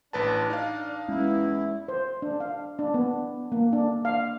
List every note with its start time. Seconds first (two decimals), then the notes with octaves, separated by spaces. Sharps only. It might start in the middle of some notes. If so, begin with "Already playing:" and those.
0.13 A1 D4 B4 A5
0.50 D#4 F5
1.08 E2 G#3 C#4 E4
1.88 C5
2.22 D4
2.40 F5
2.79 D4
2.94 B3
3.52 A#3
3.73 D4
4.05 F5